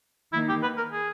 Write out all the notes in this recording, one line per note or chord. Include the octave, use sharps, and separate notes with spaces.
D#3 A#3 D#4 E4
G4
B4
A#4
G#4